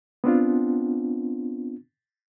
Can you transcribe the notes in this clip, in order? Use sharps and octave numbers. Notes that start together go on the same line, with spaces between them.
B3 C4 D4 F4